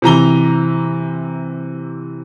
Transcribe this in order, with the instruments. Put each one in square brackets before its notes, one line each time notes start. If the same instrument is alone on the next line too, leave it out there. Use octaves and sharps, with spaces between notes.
[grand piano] C3 E3 A#5 G7